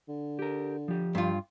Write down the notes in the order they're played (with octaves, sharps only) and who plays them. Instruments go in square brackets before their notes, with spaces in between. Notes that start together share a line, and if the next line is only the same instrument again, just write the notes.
[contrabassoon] D3
[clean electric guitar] G4 A#4
F3 G4
[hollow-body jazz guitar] G2 F4